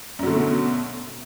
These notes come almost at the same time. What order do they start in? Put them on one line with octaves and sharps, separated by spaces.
F#2 F#3 D3 A3 B2